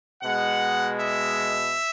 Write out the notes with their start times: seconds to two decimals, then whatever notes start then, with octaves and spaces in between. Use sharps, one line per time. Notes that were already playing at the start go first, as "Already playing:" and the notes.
0.22 B2 G#3 F#5
1.00 E5